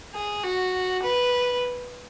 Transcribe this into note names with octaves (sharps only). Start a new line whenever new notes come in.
G#4
F#4
B4